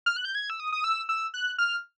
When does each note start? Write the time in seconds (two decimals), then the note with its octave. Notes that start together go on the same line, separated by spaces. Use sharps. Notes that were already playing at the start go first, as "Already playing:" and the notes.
0.06 F6
0.16 F#6
0.25 G6
0.35 G#6
0.50 E6
0.60 D#6
0.72 D#6
0.84 E6
1.09 E6
1.34 F#6
1.58 F6